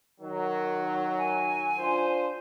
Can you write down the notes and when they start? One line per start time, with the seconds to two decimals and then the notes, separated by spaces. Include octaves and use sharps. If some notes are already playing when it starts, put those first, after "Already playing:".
0.21 D#3 F#3
1.18 G#5
1.79 D4 F4 C5